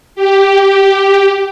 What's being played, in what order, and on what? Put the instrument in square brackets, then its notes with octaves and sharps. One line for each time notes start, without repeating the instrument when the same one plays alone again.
[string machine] G4